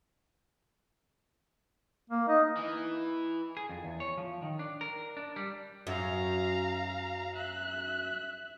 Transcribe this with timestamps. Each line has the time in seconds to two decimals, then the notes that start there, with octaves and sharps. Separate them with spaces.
2.10 A#3
2.28 D#4 D#5
2.57 E3
3.57 G#4
3.69 F2
3.85 E2
4.00 C#5
4.18 F3
4.42 D#3
4.59 D4
4.81 A#4
5.17 D4
5.36 G3
5.87 F#2 F5 A#5
7.35 E5 F#6